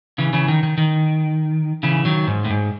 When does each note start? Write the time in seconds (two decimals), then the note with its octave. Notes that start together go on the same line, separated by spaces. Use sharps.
0.18 C#3 E3
0.33 C#3 E3
0.48 D#3
0.63 D#3
0.78 D#3
1.83 C#3 E3
2.05 D#3 F#3
2.27 G#2
2.45 A2
2.50 G#2